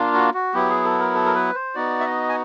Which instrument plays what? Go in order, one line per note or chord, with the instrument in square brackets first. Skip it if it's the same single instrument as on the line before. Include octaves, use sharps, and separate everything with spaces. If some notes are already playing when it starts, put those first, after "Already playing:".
Already playing: [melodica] A#3 D4 F4
F#4
F#4
F#3 B3 E4 G4
G#4
A4
A#4
A4
A#4
B4
C5
B3 D#4 F#4 D5
E5
D#5
G#5